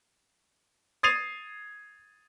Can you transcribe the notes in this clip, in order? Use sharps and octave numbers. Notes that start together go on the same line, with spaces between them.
D#6 G#6 A6 C7 D#7 F7